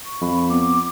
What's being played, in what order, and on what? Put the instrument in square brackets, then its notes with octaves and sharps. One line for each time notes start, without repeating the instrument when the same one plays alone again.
[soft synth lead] C#6
[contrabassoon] F2 [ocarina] B5
[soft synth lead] B3 [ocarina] D6